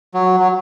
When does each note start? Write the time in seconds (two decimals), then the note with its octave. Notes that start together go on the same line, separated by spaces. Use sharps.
0.14 F#3
0.40 F#3